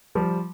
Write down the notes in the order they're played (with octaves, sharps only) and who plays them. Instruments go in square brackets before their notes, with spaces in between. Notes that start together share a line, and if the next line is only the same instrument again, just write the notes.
[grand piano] F3 G3